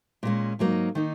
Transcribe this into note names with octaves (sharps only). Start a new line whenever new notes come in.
A#2 G#3 C#4
G#2 F#3 A#3 D#4
D#3 A#3 D#4